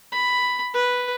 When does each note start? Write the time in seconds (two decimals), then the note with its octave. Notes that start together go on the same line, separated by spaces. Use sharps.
0.12 B5
0.74 B4